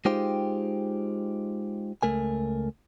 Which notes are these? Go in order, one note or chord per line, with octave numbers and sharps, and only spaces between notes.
G#3 D#4 F4 G4 C5 G5
C#2 A3 A#4 G#5